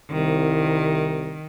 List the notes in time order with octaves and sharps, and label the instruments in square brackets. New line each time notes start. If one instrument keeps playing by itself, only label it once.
[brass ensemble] C2 [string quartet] D#3